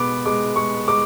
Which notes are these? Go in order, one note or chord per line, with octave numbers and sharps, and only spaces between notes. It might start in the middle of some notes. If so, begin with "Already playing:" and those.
Already playing: B2 G#3 B3 D6
G#3 D6
G#3 C#6
G#3 D6